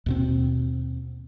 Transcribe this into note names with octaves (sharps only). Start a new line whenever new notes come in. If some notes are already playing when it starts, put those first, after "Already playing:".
D#2 B2 C4